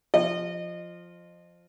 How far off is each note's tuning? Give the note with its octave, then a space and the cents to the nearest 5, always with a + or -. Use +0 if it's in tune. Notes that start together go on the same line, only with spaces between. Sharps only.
F3 +0 D#5 -25